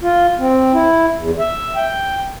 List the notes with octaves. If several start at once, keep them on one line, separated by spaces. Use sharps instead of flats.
F4
C4
E4
E2
E5
G5